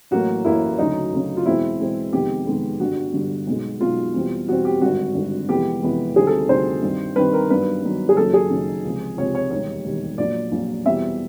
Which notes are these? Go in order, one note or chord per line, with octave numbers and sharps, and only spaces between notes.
A1 A2 F#3 A#3 F#4
A1 A2 F#3 A#3 E4
D2 C#3 F#3 D#4
D2 C#3 F#3
F4
E2 B2 G#3 C4 E4
E2 B2 G#3 C4
F2 C3 D#3 G#3 B3 G4
F2 C3 D#3 G#3 B3
G1 G2 D3 G3 F#4
G1 G2 D3 G3
B1 B2 G#3
B1 B2 G#3 F4
E2 B2 G3 C4
E2 B2 G3 C4 F#4
G4
G#1 G2 D3 F#4
G#1 G2 D3
F2 C3 E3 G#3 B3 G4
F2 C3 E3 G#3 B3
D2 C3 D#3 G3 C4 G#4
A4
D2 C3 D#3 G3 C4 C5
G2 D#3 G3 C4
G2 D#3 G3 C4 B4
A#4
G2 D#3 F#3 B3 B4
G2 D#3 F#3 B3
G#4
F#1 F#2 D#3 F#3 A4
G#4
F#1 F#2 D#3 F#3
C#2 C3 F3
C#2 C3 F3 C#5
C#5
E1 D#2 D#3 G3 C#5
E1 D#2 D#3 G3
A#1 A#2 F#3 D5
A#1 A#2 F#3
E2 B2 G3 C4 E5